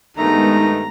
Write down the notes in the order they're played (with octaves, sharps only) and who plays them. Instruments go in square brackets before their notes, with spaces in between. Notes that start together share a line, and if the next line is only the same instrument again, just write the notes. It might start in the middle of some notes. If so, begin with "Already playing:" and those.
[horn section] G2 D#3 A3 [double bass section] G#3 B3 [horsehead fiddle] D#4 [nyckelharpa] A#5